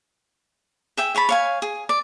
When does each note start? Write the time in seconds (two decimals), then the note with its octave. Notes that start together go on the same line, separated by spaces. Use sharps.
0.97 G#4 E5 G5
1.15 G#4 C#5 A5 B5
1.29 C#5 F5 G#5
1.62 G#4
1.89 D5